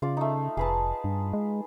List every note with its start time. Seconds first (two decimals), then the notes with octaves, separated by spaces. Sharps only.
0.02 C#3 F4 D5
0.17 A3 D#4
0.57 F1 G#4 B4 A5
1.04 G2
1.33 G#3